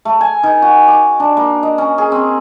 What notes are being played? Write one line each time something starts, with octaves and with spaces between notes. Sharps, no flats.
A3
G#5
D#3
F#4
D6
D4
A#3
D#5
C#4
G#4
C4